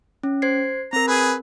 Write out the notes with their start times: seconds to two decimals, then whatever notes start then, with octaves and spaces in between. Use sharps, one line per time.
0.23 C#4
0.42 C5 G#6 C7
0.93 C4 A#4 A#5
1.07 G#4 B4